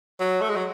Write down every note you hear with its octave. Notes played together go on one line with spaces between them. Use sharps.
F#3
A3
G#3
F#3